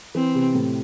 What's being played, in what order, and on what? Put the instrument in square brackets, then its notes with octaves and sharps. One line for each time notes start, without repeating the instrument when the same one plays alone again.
[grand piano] E3 [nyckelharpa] C4
[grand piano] C3
A2